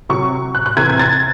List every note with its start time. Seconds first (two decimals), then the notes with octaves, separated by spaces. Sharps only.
0.09 C3 F#3 C#6
0.55 F#6
0.66 F#6
0.77 C3 E3 G#6
0.89 G#6
0.99 A6